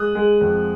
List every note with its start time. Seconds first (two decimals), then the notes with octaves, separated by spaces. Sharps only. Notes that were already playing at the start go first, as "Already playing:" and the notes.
Already playing: G#3 D#6 F#6
0.15 G#3
0.41 F2